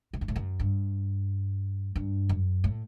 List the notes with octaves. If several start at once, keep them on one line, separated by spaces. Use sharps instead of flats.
A2
G2
A2
F#2
G2
G2
F#2
A2